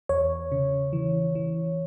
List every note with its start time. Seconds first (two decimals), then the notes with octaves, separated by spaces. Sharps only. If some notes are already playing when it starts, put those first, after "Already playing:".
0.09 E2 C#5
0.52 C#3
0.93 E3
1.35 E3